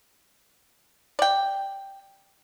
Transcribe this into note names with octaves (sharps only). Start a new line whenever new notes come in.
D5 G5